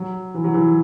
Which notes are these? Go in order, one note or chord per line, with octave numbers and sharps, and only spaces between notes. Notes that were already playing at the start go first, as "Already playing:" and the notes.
Already playing: F#3
E3
F#3
E3